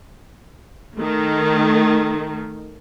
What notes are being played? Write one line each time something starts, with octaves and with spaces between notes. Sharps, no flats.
D#3 A3